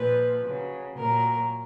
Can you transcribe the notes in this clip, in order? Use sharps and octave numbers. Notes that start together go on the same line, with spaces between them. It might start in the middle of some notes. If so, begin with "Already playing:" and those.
Already playing: A#2 F3 B4
C#3 F#3
A#2 F#3 A#4